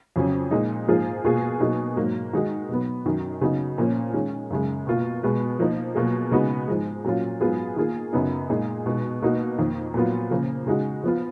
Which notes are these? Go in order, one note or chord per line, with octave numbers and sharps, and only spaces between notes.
F2 C#3 F#3 C#4
A#2 G#3 D#4
G#2 F3 A#3 F4 G#4
B2 A#3 F4 G#4
B2 F#3 A#3 D#4 G#4
G#2 F#3 A#3
D#3 G#3 D#4 F#4
B2 F#3 B3
F#2 D#3 F#3 C#4
C#3 F#3 B3 D#4 F#4
A#2 F3 A#3 C#4
D#3 G#3 C#4
F#2 C#3 G#3
B2 A#3 F4
B2 G#3 B3
F3 A#3 D#4
B2 F#3 A#3 F4 G#4
C#3 G#3 B3 D#4 F#4
G#2 F3 G#3
A#2 F#3 C#4 F4
G#2 F#3 B3 F4 G#4
D#3 A#3 F4 G#4
F#2 C#3 F#3 B3 D#4
A#2 G#3 D#4 G#4
B2 G#3 D#4
B2 A#3 D#4 F#4
F2 D#3 A#3
A#2 F#3 B3 F4
C#3 F3 A#3
C#3 G#3 D#4 F#4
F3 B3 F4